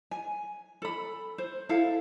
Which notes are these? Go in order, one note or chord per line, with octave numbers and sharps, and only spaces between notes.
G#5
A4 B5
C5
E4 A4 F5